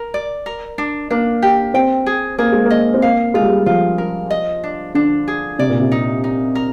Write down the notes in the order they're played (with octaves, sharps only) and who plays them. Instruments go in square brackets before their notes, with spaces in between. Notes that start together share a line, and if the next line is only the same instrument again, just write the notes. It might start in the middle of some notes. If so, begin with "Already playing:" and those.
Already playing: [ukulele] A#4
D5
A#4
D4
[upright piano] A#3 [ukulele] D4
[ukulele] G4
[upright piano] C4 [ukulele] G5
[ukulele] G#4
[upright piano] A#3 [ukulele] G#4
[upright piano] G#3
A#3
[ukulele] D#5
[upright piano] C4
[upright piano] A#3 [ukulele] F5
[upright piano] G#3 [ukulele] F4
[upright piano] G3
G#3
[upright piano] F3 [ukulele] F4
[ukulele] A#4
D#5
D4
[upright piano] D3 [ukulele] D4
[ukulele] G#4
[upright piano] C3 [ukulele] D5
[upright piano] A#2
C3
[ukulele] D#4
D#4
A#4